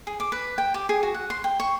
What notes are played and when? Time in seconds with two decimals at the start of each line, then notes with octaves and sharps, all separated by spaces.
0.07 G#4
0.20 D6
0.32 B4
0.58 G5
0.74 G4
0.89 G#4
1.03 F#4
1.14 F#5
1.30 C6
1.44 G5
1.60 C#6